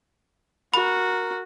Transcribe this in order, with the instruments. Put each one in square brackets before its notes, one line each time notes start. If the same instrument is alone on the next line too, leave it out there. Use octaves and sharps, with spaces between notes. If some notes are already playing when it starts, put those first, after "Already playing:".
[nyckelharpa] F#4 [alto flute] A#4 [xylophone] B5